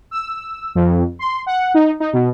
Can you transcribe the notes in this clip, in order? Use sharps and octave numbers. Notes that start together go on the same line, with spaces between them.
E6
F2
C6
F#5
D#4
D#4
B2